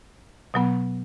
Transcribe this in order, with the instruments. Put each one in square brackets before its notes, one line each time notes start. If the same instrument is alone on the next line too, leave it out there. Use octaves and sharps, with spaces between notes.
[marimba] B2 F#3 B3